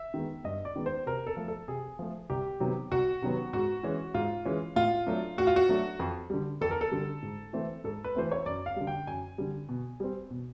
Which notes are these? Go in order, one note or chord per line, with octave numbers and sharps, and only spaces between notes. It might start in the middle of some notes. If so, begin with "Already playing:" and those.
Already playing: E5
D#3 G#3 B3
G2 D#5
D5
D#3 G#3 B3
C5
C3 A#4
A4
F3 A3
A4
C3 G#4
F3 A3
C2 G4
C3 D#3 F#3 B3
C2 F#4
C3 D#3 F#3 B3
G#2 F#4
E3 G#3 C#4
G#2 F4
E3 G#3 C#4
A2 F4
F#3 A3 D4
A2 F#4
F4
F#4
F#3 A3 D4
F2
D3 G3
F2 A4
A#4
A4
D3 G3
G#2
E3 A3 C4
G#2 A4
B4
E3 A3 C4 C5
C#5
F#2 D5
F5
D3 G3
G5
F#2 G#5
D3 G3
B2
G3 C4
B2